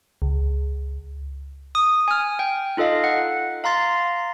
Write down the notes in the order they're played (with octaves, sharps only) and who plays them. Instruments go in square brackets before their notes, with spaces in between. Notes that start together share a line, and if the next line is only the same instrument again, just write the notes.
[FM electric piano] C#2
[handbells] D#6
G#5 F6
G5
D#4 F4 A4 D#5 F5
F#5
F5 A#5 C6 A6